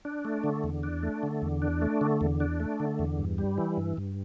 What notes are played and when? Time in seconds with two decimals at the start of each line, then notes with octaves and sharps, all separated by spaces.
0.05 D4
0.25 A3
0.44 D3
0.64 E2
0.83 D4
1.03 A3
1.23 D3
1.42 E2
1.62 D4
1.82 A3
2.01 D3
2.21 E2
2.40 D4
2.60 A3
2.80 D3
2.99 E2
3.19 G2
3.38 G3
3.58 E3
3.77 G2
3.97 G2